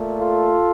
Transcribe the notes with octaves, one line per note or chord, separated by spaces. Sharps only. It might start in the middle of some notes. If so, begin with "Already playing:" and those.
Already playing: A#2 A3
F4 A4